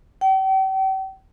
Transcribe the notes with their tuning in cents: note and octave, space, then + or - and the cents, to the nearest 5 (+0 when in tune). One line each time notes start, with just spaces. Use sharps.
G5 -40